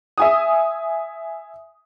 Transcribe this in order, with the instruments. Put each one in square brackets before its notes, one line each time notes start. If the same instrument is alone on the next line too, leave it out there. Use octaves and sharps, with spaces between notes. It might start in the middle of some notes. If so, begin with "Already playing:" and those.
[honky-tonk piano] E5 G#5 D#6